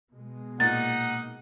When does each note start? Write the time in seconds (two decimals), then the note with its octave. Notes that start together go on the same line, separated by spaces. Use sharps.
0.12 B2 G#3
0.60 A#2 D#4 F#5 A6